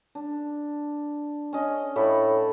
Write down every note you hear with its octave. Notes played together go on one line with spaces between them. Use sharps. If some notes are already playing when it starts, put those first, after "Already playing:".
D4
C#4 D#5
A2 A4 B5 D6